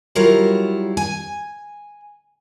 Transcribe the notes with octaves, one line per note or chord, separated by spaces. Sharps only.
F#3 G3 E4 F4 A#4 C#5
G#5